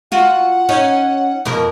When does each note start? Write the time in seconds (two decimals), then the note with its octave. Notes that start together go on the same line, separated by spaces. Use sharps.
0.12 F4 F#4 F#5
0.69 C#4 D#4
1.45 F2 B2 A#4